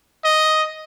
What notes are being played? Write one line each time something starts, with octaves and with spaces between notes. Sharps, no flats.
D#5